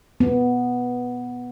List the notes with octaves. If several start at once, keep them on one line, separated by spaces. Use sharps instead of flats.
B3